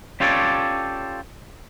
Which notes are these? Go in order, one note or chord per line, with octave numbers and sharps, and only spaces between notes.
C#4 F4 G4 A4 C#5 D5